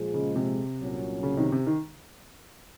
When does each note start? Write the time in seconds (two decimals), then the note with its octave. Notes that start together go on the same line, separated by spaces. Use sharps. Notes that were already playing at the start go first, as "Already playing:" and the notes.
Already playing: A#2 F3 G#3
0.14 C#3
0.36 C3
0.79 C2 A#2 F#3 C#4
1.23 C#3
1.37 C3 D#3
1.52 C3
1.67 D#3